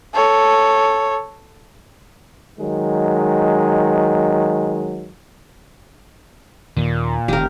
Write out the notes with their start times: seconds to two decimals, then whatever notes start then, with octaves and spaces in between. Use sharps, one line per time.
0.14 A4 C#5
2.59 D#3 F#3 G#3
6.77 D#2 A#2 D#3
7.28 F1 D#3 G4 A#4